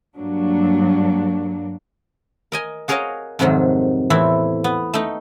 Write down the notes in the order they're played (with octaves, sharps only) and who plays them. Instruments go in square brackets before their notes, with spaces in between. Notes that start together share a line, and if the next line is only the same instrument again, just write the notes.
[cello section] G2 F#3 A#3 D4
[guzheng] A#4 D#5 G#5
F#4 G#4 A#4 C#5 D#5 F5
F2 G#2 C3 D#3 F#3
E2 A2 E3 C4 E4
B3
A3 D#4